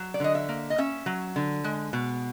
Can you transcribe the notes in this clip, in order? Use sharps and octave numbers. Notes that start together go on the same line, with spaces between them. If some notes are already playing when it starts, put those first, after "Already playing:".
Already playing: F#3
D5
D3 D#5
E5
A#3
D#5
C#4 E5
F#3
D3
G#3
B2